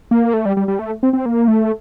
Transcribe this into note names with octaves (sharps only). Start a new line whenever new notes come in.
A#3
A3
G3
G3
G3
A3
C4
C4
A#3
A3